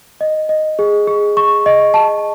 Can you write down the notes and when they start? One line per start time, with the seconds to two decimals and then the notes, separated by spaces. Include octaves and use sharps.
0.21 D#5
0.49 D#5
0.79 G#4
1.07 G#4
1.37 C#6
1.66 D#5
1.94 A5